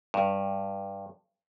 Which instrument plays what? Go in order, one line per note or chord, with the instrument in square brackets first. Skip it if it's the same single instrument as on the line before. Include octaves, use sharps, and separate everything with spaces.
[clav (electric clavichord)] G2